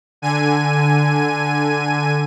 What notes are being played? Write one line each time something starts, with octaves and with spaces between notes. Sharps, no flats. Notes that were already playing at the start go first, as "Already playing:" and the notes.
D3 G#5 D#7